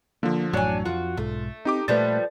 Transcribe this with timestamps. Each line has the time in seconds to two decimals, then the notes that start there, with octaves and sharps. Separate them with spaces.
0.23 D3 F3 A#3
0.53 A1 F#2 A2 F#3 D4 C#5 G#5
0.85 F2 F3 F4 F#4
1.17 B1 G#2 A3
1.65 C4 D#4 G4 D6
1.88 A#2 F3 G3 A3 A4 B4 A6